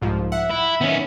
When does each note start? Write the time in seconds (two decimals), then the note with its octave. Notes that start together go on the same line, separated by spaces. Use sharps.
0.01 C2 G#2 F3
0.32 E5 F#5
0.51 E4
0.81 D#3 B3 C#4